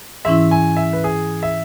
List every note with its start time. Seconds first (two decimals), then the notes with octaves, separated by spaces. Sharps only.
0.25 G#2 E3 C#4 E4 E5
0.51 G#5
0.77 E5
0.93 B4
1.04 G#4
1.43 E5